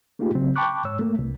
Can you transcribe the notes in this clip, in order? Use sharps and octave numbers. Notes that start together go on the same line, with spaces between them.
A3 A#3 D#4 F4 G4 G#4
C#3 F#3 C4
G5 A5 B5 C#6 D6 F#6
G#2 C#5 E6
A3 A#3
C2